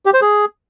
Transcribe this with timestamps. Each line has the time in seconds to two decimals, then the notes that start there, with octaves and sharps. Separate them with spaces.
0.06 G4
0.14 C5
0.21 G#4